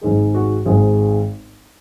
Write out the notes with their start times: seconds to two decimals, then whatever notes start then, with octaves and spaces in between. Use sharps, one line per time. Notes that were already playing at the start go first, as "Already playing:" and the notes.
0.01 G#1 G#2 G#3 G#4
0.34 F#4
0.65 G#1 G#2 G#3 G#4